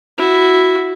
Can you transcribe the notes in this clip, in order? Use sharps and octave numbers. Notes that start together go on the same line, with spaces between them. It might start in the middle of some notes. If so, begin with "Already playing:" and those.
E4 F#4